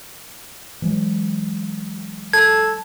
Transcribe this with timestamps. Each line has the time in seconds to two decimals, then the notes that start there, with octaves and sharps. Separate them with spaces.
0.82 E3 F#3 G#3
2.33 A4 G#6